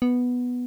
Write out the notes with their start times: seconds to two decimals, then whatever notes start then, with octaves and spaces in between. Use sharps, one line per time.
0.02 B3